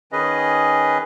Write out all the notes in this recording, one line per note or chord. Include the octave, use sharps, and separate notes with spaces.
D#3 C#4 G#4 B4 D#5